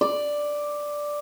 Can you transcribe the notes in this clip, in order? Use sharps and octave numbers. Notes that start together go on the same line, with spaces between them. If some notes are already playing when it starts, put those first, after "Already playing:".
D5